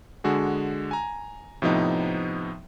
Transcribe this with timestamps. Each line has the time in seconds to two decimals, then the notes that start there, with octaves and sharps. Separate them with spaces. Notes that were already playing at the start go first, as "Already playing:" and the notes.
0.24 D3 G#3 F#4 G#4
0.91 G#5 A#5
1.62 A2 C3 F3 B3 D#4